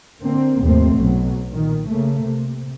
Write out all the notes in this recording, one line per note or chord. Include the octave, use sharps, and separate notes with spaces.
D3 A#3 C4
D#2 G#2 C3 F3 A3 C4
B1 B2 F#3
A#2 D#3
C#3 A3 A#3
C3